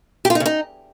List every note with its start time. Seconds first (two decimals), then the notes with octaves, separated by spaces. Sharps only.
0.25 G4
0.30 F4
0.35 D#4
0.40 C#3
0.46 D#4